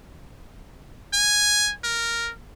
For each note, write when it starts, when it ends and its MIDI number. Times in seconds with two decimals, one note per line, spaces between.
1.13 1.72 80
1.84 2.31 70